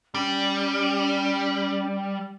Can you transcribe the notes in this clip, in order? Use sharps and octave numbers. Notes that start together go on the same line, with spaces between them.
G3 C#4